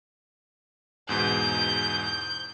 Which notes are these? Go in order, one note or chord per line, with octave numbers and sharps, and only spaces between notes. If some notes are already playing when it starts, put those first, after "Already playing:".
E2 G#2 B2 G6